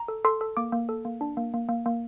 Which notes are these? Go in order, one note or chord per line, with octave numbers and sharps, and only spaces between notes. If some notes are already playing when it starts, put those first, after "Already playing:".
Already playing: A#5
A4
A4 C6
A4
A#3 D6
A#3
A4
A#3
D4
A#3
A#3
A#3
A#3